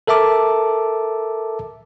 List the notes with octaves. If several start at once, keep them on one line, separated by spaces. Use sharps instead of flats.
A4 A#4 E5 A5 D6